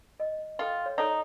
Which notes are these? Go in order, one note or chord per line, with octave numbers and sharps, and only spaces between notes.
D#5
F4 A4 G5
C#5
D#4 A4 C#5 D5